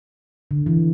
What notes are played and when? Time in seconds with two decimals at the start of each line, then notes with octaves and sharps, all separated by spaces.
0.51 D3
0.66 E3